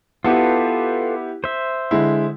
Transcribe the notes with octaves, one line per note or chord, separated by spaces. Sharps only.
B3 E4 F4 G4 A4 B4
C5 E5
D3 G#3 E4